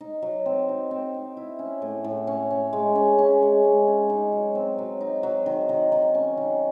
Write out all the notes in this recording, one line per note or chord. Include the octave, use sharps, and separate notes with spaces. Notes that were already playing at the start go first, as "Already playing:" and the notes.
D#4
F#3
C4
D#4
C4
D#4
E4
C#4
A2
A2
C#4
C#4
G#3
C#4
C#4
G#3
G#3
C#4
D#4
F#3
C4
F#3
D#4
F#3
D#3
D#3
D#3
C#4
D#3